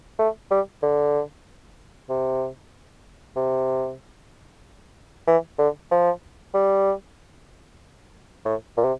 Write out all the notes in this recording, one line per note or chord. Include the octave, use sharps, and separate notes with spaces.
A3
G3
D3
C3
C3
E3
D3
F3
G3
A2
A#2
C3